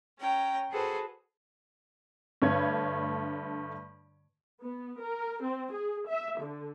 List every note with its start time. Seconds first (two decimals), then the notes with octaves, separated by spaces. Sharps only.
0.18 C#4 G5 A#5
0.71 F#4 G#4 A4 B4 C5
2.42 G2 D3 A3 B4 C#5 G#6
4.62 B3
5.01 A#4
5.42 C4
5.72 G#4
6.08 E5
6.39 D3